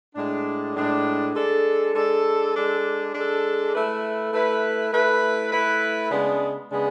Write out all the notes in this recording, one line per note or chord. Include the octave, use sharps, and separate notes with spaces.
A2 G#3 D4
A2 G#3 D4
G#3 D4 A4
G#3 D4 A4
G#3 D4 A4
G#3 D4 A4
A3 E4 B4
A3 E4 B4
A3 E4 B4
A3 E4 B4
C#3 G#3 B3 D4 G#4
C#3 G#3 B3 D4 G#4